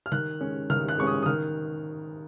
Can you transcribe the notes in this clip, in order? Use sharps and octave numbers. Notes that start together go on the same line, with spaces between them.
F6
D#3 F#6
G#3 C#4
D#3 F6
F#6
G#3 C#4 C#6
D#6
D#6
D#3 F6